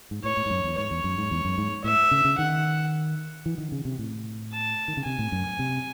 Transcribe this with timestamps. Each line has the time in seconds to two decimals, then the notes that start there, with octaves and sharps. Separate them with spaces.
0.11 G#2
0.24 A2 C#5
0.37 A2
0.46 G#2
0.50 F#2
0.64 E2
0.77 G#2 C#5
0.91 E2
1.04 F#2
1.18 G#2
1.31 E2
1.45 F#2
1.58 G#2
1.84 A2 E5
2.11 C#3
2.25 C#3
2.38 D#3 F#5
3.46 E3
3.58 D#3
3.72 C#3
3.85 C3
3.99 A2
4.52 A5
4.88 D#3
4.97 C#3
5.05 C3 G#5
5.19 A2
5.32 F#2
5.59 C3